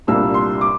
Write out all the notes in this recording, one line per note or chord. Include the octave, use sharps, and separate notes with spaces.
C2 A#2 G3 A#3 D4 E6
C6
D6